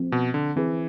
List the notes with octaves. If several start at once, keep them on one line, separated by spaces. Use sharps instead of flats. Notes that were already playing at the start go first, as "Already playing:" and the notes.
Already playing: F3 A3 C4
B2
D3
E3 C4 G#4 B4